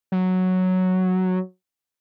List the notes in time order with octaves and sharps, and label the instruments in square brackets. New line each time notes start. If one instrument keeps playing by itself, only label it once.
[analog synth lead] F#3